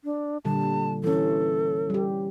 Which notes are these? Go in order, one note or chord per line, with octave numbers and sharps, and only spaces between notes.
D4
A#2 D3 G3 A5
E3 C#4 A4
G3 G4